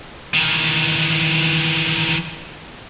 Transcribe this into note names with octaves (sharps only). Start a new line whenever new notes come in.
D#3 E3